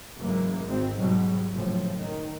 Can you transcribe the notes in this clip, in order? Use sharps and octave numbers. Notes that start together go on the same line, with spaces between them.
F#1 G#2 E3 G#3 A#3
G#1 C4
E2 G#2 B2 F#3 G3
F#1 A2 F3
D#3